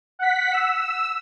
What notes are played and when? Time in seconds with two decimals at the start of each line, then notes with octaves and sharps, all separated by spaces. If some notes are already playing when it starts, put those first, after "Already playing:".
0.19 F#5 B6
0.52 E6